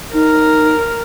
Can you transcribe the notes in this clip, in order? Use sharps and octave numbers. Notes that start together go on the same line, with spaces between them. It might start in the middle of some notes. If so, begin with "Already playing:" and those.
D#4 A#4